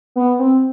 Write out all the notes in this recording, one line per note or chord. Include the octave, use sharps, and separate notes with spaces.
B3
C4